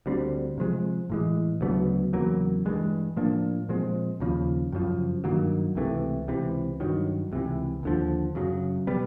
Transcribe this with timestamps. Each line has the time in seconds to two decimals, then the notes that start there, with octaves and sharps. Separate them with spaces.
0.06 D2 D3 G3 C4
0.58 C3 F3 G#3
1.10 A2 E3 G#3
1.61 D2 C#3 F#3 B3
2.13 E2 C#3 F#3 A#3
2.65 G2 E3 G#3
3.16 A2 F3 A#3 D4
3.69 A#2 F3 G#3 C4
4.20 D#2 C#3 F3
4.72 F#2 C#3 F3
5.24 G2 D#3 F#3 A#3
5.75 C#2 C3 E3 A3
6.28 C#2 C3 E3
6.80 G2 D#3 F#3
7.32 C#2 C3 E3
7.83 D#2 D3 F3
8.35 F#2 C#3 F#3
8.87 B2 G3 B3